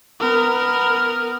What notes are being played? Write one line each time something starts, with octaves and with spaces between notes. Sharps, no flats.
B3 A#4